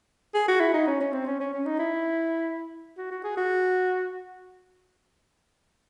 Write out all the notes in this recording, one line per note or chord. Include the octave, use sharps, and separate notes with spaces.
G#4
F#4
E4
D#4
C#4
C#4
C4
C#4
C#4
C#4
D#4
E4
F#4
F#4
G#4
F#4